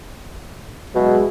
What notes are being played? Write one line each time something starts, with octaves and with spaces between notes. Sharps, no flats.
B2 F#3 G#3 E4